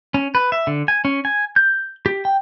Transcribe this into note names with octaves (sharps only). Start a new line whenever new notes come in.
C#4
B4
E5
D3
G#5
C#4
G#5
G6
G4
G5